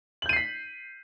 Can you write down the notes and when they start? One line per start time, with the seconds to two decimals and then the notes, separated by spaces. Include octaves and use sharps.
0.22 F#7
0.26 G6
0.29 D#7
0.33 C7
0.36 B6